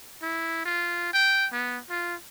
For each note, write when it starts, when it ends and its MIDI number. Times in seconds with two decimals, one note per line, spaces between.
0.23 0.65 64
0.66 1.10 65
1.14 1.48 79
1.52 1.79 59
1.90 2.15 65